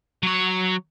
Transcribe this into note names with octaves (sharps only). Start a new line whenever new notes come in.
F#3 C#5